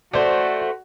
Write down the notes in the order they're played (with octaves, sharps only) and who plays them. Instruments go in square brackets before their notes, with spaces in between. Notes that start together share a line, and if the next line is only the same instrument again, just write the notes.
[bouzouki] A3 C5 [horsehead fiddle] F#4 [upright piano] D5